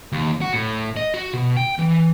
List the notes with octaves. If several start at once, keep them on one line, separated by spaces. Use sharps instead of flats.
D#2
F#4
A2
D#5
F#4
B2
G5
E3